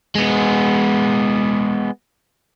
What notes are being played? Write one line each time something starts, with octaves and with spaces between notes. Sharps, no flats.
G#3 B3